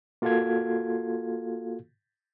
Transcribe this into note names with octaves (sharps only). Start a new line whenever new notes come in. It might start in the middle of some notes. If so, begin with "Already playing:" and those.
A#3 F4 F#4 A4 F5 G#6